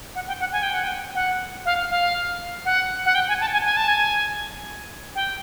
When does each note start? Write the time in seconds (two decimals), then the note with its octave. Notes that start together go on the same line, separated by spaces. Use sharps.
0.15 F#5
0.28 G5
0.40 F#5
0.52 G#5
0.63 G5
0.74 F#5
0.84 G5
1.15 F#5
1.65 F5
1.90 F5
2.65 F#5
3.05 F#5
3.15 G5
3.28 G#5
3.41 A5
3.53 G#5
3.65 G#5
3.77 A5
3.88 G#5
5.15 G5